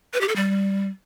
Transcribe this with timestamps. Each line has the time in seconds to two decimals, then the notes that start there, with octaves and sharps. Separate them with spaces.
0.13 B4
0.21 G4
0.28 A4
0.36 G3